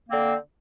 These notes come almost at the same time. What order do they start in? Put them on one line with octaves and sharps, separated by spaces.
A#3 C4 D3